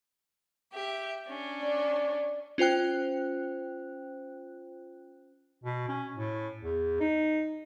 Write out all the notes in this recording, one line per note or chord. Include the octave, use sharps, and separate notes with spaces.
G4 E5
C#4 D4
D5
C#4 F4 C5 G5 F#6
B2
C#4
A2
E2
D#4